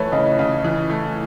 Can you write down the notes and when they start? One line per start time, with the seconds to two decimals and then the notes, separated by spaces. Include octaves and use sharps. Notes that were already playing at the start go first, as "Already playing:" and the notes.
Already playing: E3 A3 B4 C#5
0.12 C#3 D#5
0.39 C#3
0.64 E3
0.90 A3